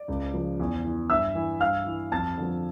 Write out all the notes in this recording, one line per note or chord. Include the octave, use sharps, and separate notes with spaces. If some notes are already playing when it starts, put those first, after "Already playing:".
Already playing: D5
C#2
C#3 F3
E2
E3
G2 E5 E6
E3
G2 F5 F6
E3
F2 A5 A6
D3 F3